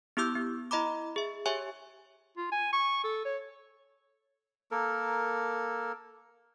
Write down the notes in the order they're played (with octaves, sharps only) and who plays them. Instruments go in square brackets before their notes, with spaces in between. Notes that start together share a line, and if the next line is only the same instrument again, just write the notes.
[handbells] B3 E4 G4 D6 E6 G6
B3
E4 D#5 A#5 B5 D6
G#4 E5
G4 C#5 E5 G#5 C#6
[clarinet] F4
G#5
C#6
A4
C#5
[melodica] A#3 A4 A#4